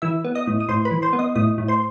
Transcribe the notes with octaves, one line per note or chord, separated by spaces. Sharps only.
E3 E5 E6
B3
D#5 D#6
A2
D#6
A2 C5 C6
B4 B5
E3
C5 C6
B3
D#5 D#6
A2 D#5 D#6
A2
C5 C6